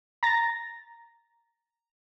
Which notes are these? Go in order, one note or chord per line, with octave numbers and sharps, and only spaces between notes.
A#5 A6 A#6